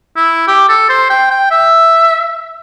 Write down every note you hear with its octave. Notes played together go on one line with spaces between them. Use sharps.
E4
G4
A4
C5
G5
G5
E5